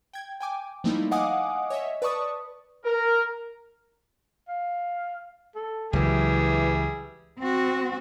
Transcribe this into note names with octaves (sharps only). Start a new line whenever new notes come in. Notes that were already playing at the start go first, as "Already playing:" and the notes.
G5 G#6
G5 G#5 D6
F3 G3 A3 A#3 D#4 E4
D#5 F5 F#5 G#5 D6 D#6
C#5 D#5 E5
B4 D5 A5 C#6 D#6
A#4
F5
A4
C#2 E3 F#3 G3 G#4 E5
C4 F#4